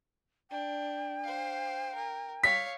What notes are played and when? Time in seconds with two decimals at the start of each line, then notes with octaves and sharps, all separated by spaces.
0.51 D4 G5
1.24 C5 F5
1.95 A#4
2.43 C#5 F5 B6